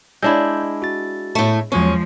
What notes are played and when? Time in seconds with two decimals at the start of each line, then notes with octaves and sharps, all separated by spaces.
0.23 G#3 D4 E4 E6 G6
0.82 F#4 A6
1.35 A2 A3
1.72 E2 F3 F#3 G#3 C#4 C#5